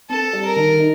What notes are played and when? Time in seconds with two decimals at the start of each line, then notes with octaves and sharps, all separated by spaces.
0.09 C4 A4
0.33 G3
0.45 A#4
0.56 D#3
0.80 D#4